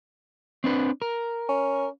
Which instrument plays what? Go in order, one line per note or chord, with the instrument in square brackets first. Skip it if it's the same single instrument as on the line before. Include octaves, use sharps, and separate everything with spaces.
[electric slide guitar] C4 D4 B4
A#4
[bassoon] C#4